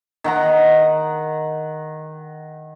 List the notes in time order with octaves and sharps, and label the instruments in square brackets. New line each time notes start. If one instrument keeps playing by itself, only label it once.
[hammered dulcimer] D#3 F#5 A#5